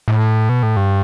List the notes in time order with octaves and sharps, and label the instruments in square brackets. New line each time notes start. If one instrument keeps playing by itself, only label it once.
[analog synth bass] A2
B2
A2
G2